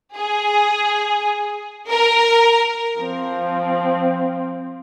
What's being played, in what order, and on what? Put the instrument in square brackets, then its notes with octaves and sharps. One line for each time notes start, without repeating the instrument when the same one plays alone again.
[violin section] G#4
A#4
[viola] F3 C4